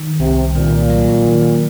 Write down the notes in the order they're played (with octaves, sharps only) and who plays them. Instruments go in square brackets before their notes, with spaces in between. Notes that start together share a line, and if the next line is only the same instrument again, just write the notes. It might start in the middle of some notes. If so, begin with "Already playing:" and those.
Already playing: [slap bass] D#3
[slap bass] C2 [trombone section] C3
[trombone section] A#2 [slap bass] D#3
[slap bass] F#3
D#3